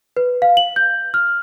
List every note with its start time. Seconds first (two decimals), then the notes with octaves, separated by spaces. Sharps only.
0.17 B4
0.42 F5
0.57 F#7
0.76 G6
1.14 F6